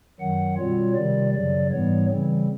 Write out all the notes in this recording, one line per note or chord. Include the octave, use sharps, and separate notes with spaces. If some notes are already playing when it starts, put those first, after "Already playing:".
F#2 D#3 F#3 F#5
B2 G3 C4 F4 C#5
C3 D#3 G3 D5
F#2 C#3 F#3 D5
G#2 E3 G3 B3 C#5
C#3 E3 G3 C4